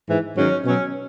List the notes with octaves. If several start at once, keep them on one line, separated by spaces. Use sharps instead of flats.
G#2 E3
G#2 D#3 F#3 C#4
B2 F#3 C#4